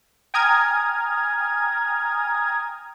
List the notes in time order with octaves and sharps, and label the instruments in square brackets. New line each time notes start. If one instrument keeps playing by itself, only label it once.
[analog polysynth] G5 G#5 A#5 D#6 F6 G#6